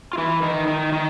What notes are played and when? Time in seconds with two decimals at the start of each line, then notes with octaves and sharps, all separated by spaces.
0.13 F4
0.18 E3 E4
0.43 D#3 D#4
0.67 D#3 D#4
0.92 D#3 D#4